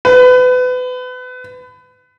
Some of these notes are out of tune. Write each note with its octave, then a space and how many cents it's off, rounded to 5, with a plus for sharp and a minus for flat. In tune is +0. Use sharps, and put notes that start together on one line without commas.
B4 +30